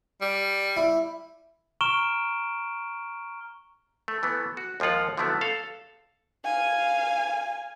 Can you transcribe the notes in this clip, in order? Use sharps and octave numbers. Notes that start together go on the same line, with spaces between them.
G3
E4
A#5 C#6 F6 D7 E7 G7
A3
E3 A3 B3
F#4
D#2 F3 G#3 F4 F#5
D3 F3 F#3 A3 B3 E4
A4 F5
F5 G#5